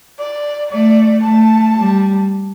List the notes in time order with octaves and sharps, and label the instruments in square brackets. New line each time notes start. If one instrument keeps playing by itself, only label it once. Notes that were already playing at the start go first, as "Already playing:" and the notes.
[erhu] D5
[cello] A3 [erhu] D5
[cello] A3 [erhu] A5
[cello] G3